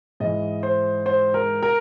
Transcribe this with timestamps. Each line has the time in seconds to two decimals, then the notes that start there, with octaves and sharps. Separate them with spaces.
0.20 G#2 E3 D#5
0.63 C5
1.06 C5
1.34 A#4
1.63 A#4